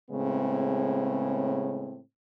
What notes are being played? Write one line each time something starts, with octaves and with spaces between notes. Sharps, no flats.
A2 C#3 G#3 B3 C4